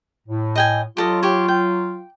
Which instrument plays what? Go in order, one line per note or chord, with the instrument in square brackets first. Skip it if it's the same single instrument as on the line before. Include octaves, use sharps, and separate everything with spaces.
[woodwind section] A2
[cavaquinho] D#5 G5 G#5
[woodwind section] F#3 F4 [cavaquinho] G4 A4 D#5
[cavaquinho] G4 C#5
G5